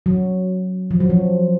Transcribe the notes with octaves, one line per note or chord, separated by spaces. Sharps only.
F#3
F3
F#3
F3